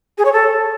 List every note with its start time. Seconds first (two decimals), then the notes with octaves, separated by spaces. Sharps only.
0.17 G#4
0.25 C#5
0.32 A4